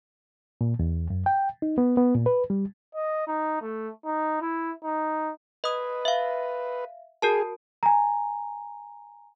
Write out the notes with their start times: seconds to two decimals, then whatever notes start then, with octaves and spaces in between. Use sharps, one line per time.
0.61 A#2
0.79 E2
1.10 F#2
1.26 G5
1.62 D#4
1.78 B3
1.97 B3
2.15 A#2
2.26 B4
2.50 G3
2.94 D#5
3.27 D#4
3.62 A3
4.05 D#4
4.41 E4
4.83 D#4
5.64 B4 D#5 D#6
6.05 E5 F5
7.22 F#4 G#4 A#4 A5
7.83 G#5 A#5